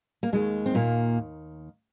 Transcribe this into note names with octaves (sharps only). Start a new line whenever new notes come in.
A#3
D#2 D#3 G#3
C4
A#2 A#3